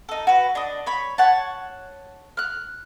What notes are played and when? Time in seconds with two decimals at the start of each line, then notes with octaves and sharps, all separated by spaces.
0.09 D#4 A4
0.27 F#4 B4
0.55 D4 D#5
0.86 C#5 B5
1.18 C#5 F#5 A5
2.37 F6 F#6